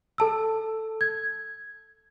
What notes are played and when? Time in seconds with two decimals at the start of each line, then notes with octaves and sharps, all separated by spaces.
0.18 A4 A5 E6
1.01 G#6